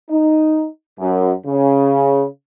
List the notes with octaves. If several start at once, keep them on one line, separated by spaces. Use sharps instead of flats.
D#4
F#2
C#3